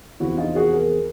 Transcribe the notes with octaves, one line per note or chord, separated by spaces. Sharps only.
E2 C3 F3 E4 F#4
D#4 F4
F#4 G#4
G#4 A#4